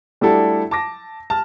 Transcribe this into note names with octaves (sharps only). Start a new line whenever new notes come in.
G3 A3 D4 E4 F#4 A4
A5 D6 A#6
A5 F6